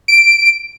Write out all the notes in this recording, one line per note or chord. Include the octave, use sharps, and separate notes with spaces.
D7